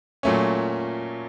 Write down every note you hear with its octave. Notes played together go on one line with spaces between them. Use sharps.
A#2 F#3 A3 C#4